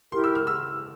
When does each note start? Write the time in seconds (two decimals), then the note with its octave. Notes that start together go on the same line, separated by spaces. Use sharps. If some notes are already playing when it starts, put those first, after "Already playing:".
0.11 E4 G4 A#4 C6
0.24 E6
0.35 F6
0.47 E6